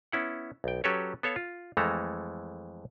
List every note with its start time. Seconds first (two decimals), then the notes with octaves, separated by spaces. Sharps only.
0.12 B3 C#4 E4 F#5
0.64 B1 G5
0.84 F#3 C#4 G4 A4 B4 C#5
1.23 B3 A4 C#5 F5
1.36 F4
1.77 F2 E3 G#3 A3 A4 A#5